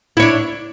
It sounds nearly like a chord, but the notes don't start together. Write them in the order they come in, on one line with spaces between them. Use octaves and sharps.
E4 C#5 D4